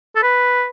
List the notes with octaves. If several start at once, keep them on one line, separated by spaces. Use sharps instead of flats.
A4
B4